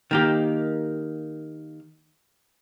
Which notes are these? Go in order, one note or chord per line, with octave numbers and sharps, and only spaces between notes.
D#3 A#3 G4